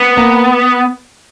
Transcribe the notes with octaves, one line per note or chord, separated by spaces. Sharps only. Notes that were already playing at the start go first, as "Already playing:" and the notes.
Already playing: B3
A#3